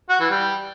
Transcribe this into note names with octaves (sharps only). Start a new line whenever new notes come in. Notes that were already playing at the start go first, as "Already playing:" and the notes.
F#4
E3
G3